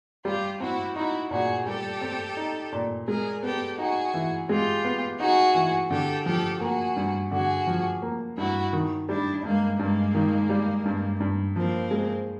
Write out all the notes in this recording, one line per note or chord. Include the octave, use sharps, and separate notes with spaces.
G3 F4 G4
C4 E4 F#4
D#4 E4 F#4
A#2 F#4 G#4
G3 G4 A4
C4
D#4
A#2
G#3 G#4 A#4
B3 G4 A4
D#4 F#4 G#4
E3
G#3 F4 G4
B3
D#4 F#4 G#4
E3
D3 G4 A4
F3 G4 A4
A#3 F#4 G#4
G2
D3 F#4 G#4
F3
A#3
G2 E4 F#4
D#3
G3 D4 E4
G2 G#3 A#3
G2 G#3 A#3
D#3
G3
G2
G2
F3 A#3 C4
G#3